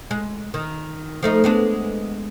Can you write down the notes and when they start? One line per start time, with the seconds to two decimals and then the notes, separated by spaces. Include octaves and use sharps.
0.11 G#3
0.54 D#3
1.23 F3 A3 D#4
1.44 G#3 B3 D4